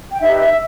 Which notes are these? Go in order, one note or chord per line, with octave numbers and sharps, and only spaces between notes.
G5
D#4 G4 B4 E5
E5